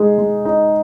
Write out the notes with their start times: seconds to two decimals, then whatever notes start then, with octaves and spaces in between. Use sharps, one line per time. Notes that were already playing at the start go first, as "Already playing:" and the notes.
Already playing: G#3 D#4 G#4
0.18 G#3
0.45 D#4